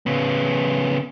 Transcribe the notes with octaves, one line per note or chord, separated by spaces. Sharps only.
C#3 B3